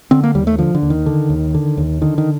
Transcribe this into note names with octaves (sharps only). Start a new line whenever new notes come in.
D3 C4
A#3
D#2 G3
A3
D3 F3
D3
D#2
D#3
D3
D#2
D3
D#2
D3 D#3
D#3